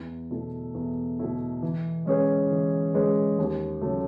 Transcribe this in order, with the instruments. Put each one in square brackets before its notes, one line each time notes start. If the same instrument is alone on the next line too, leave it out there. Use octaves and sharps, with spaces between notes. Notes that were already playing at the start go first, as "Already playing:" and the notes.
Already playing: [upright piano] E2
B2 A3 E4 A4
E2
B2 A3 E4 A4
E3
G#3 C#4 G#4 B4
E3
G#3 C#4 G#4 B4
D#2
C#3 F#3 A3